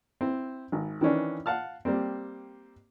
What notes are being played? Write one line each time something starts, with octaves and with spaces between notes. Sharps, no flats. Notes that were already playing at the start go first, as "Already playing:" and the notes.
C4 E4
G#1
D#3 E3 C#4 D4
F5 F#5 A5 F6
G3 A#3 C4